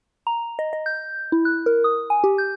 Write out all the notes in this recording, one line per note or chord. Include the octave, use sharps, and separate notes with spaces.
A#5
D#5
D#5
G6
E4
F#6
A#4
D#6
G#5
G4
G6